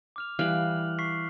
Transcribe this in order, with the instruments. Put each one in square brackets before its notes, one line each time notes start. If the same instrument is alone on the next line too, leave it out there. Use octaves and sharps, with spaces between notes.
[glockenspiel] D6 F6 F7
[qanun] E3 G3 F5 [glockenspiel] F6 F#6 F#7
[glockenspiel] C#6 B6 C7